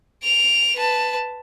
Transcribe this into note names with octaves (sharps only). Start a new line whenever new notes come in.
D7 F7
B4 A5